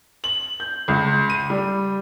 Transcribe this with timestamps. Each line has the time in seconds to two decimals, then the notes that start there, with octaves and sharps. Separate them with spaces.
0.24 F#7
0.60 G6
0.88 C#2
1.30 D#7
1.50 G3